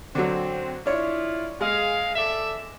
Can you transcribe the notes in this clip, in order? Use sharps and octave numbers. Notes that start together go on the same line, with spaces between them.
D3 F#3 C4
D4 E4 F4 C#5
G#3 G#4 F5
A4 D5 E5